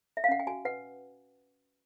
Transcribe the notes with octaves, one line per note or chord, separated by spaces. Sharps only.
E5
F5
C#4 F#5
G5
F#4 G#5
B4 F#5